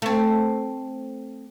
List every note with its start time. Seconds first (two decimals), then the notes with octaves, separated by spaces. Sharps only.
0.02 A3 C4